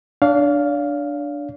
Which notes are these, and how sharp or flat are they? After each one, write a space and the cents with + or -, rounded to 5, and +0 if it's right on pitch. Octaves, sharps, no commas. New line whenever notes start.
D4 +0 D5 -45 F5 +0